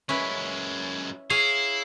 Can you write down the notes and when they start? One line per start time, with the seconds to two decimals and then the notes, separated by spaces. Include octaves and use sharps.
0.09 F#2 G#3 C#4 E4 B4
1.30 E4 G#4 C#5 F5 C7